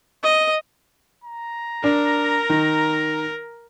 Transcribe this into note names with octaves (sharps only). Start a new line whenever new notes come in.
D#5
A#5
D4 A#4
D#3